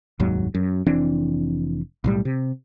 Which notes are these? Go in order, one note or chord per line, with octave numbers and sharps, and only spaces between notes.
F1 D#2 G#2 F#3
F#2
F1 E3 C4 D4
B1 A2 G3
C3